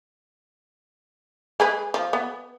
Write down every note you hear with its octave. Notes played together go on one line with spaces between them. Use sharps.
G#3 G#4 B4
F3
B3